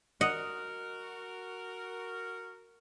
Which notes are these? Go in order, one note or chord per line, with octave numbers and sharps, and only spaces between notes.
F#4 A#4 D#5 F#5